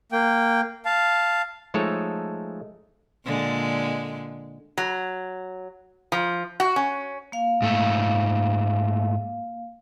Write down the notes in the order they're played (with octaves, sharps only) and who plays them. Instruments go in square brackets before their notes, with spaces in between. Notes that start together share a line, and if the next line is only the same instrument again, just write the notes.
[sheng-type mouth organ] A#3 G5
F5 A5
[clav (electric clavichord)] F3 G#3 A3 D#4 A4 C#5
[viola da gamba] A#2 D3 G#3
[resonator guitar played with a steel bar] F#3
F3
F#4
C#4
[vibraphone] A#3 F5
[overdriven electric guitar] G#2 A3